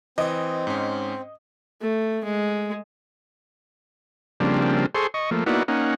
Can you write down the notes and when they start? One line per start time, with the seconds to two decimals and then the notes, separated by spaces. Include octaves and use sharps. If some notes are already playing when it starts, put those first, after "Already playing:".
0.18 E3 C4 D#5
0.67 G#2 C#4
1.82 A3
2.25 G#3
4.40 C#3 F3 G3 A#3 C4 D4
4.95 G#4 A4 C5 C6 C#6
5.14 D#5 C#6
5.31 F3 A3 A#3
5.46 A#3 B3 D#4 E4 F#4 D5
5.68 A#3 C#4 D#4 F#5